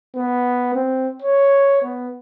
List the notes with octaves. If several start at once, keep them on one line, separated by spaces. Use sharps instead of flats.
B3
C4
C#5
B3